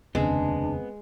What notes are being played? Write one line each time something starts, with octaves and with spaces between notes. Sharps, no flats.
F1 D#2 C#3 G#3 B3 C4 D4 G#4